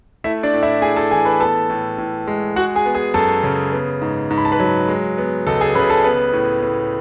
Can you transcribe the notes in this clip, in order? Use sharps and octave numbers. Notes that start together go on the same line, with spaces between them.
A3 E4 E5
D4 D5
A2
E4 E5
A2 G#4 G#5
A4 A5
E3 G#4 G#5
B4 B5
B3 A4 A5
A2
A2
G#3
G#3 F#4 F#5
G#4 G#5
B3
G#4 G#5
F#2 A4 A5
C#3
B3
G#2
G#2
B5
A5
B4 B5
F#3
G#3
B3
C#2 A4 A5
G#4 G#5
C#3 B4 B5
A4 A5
B3 B4
A2
A2